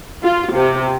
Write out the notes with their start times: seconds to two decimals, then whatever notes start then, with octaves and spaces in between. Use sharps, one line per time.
0.23 F4
0.54 C3